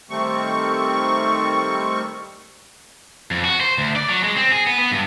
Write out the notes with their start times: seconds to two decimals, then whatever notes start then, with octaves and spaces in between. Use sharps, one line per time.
0.10 D#3 G3 A3 C4 C#6
3.31 F2
3.45 F#4
3.61 C5
3.78 D2
3.96 D5
4.09 F#3
4.24 G#3
4.37 C4
4.51 G#4
4.67 B3
4.79 B3
4.92 G2